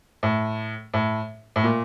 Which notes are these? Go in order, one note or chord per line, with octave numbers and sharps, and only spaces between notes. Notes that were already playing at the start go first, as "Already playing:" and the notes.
A2
A2
A2
A#2